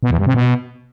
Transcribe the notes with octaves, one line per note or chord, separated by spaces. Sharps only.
B2
E2
G2
C3
B2